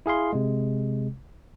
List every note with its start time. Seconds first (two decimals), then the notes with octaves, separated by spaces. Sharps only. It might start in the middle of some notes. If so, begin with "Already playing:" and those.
0.06 E4 G#4 F5 C6
0.33 C3 G#3